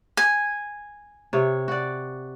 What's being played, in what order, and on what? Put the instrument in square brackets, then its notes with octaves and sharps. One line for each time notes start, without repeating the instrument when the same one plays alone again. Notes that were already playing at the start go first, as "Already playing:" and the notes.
[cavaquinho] G#5
[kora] C3 C#5
F#4 D5